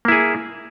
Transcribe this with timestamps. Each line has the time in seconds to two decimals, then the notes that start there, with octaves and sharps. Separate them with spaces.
0.05 A#3
0.08 E4
0.12 G#4